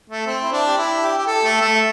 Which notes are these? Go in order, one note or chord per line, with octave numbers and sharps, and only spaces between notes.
A3
C4
E4
D4
G4
E4
G4
G4
A4
A3
A3